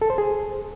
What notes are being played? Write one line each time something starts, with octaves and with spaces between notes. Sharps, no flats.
A4
C5
G#4